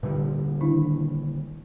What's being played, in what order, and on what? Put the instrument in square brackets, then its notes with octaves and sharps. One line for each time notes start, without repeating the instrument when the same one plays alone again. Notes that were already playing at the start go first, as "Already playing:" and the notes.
[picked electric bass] A#2 D3 G3 [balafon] B4
[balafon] D#3 D4 E4